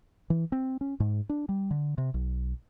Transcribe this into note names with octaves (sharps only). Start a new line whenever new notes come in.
E3
C4
C#4
G#2
D4
G3
D3
C3
B1